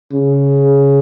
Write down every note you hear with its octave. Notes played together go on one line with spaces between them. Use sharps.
C#3